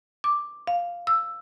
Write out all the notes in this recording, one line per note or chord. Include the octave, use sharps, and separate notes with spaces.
D6
F5
E6